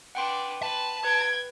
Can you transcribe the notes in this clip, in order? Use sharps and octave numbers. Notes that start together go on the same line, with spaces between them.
D4 B4 F#5 G5 C6
B4 A5
B4 G5 G#6